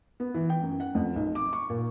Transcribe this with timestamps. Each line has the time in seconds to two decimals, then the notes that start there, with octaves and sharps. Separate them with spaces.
0.20 B3
0.34 E3
0.50 G5
0.62 F#2
0.80 F#5
0.95 F2
1.16 B1
1.35 D6
1.53 C#6
1.70 A#2